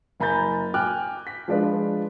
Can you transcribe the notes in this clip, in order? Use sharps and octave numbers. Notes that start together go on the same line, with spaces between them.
F#1 G#5 A#5 B5 G6 A6
G5 G#5 D6 F6 F#6
B6
F3 G#3 D4 F4 B4